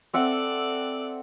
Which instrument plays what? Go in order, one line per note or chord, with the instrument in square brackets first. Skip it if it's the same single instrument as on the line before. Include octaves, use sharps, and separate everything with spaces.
[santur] C4 E5 F#5 [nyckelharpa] A4 D5